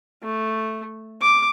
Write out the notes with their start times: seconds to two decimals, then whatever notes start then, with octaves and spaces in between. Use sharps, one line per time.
0.23 A3
1.21 D6